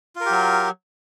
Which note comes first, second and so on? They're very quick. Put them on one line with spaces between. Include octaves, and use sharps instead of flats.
F4 A#4 G4 F#3